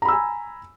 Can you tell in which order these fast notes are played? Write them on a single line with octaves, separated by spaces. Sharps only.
A#5 B5 E6 G#5